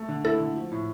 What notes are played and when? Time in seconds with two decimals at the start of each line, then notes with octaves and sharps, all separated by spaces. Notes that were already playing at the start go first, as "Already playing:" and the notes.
Already playing: A3
0.08 D3
0.25 E4 A4
0.40 D3
0.56 F3
0.72 A2